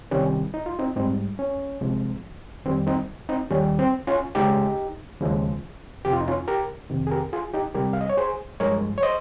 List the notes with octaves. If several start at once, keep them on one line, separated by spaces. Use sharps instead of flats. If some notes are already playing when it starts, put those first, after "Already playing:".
C2 C3 D#3 G3 C#4
D#4
F4
C4 D#4
G#2 G3 C4 D#4
C#4
C2 C3 F3 G#3
F2 D#3 G3 C4
C4 D#4
C4 D#4
D#2 D#3 G3 C#4
C4
C#4 F4
C#2 C#3 G#3 D#4 G4
D#2 C#3 F3 G#3
F2 C3 F3 G4
F4
D#4
C#4 F4
G4 A#4
F2 C3 D#3
G#4
G4 A#4
F4 G#4
D#4 G4
C2 C3 G3 G4 A#4
F5
D#5
C#5
G#4 C5
G2 F3 G#3 A#4 C#5
C#5
C5 D#5